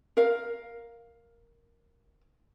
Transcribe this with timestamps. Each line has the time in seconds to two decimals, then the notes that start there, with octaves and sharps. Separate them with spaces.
0.17 A#4 F5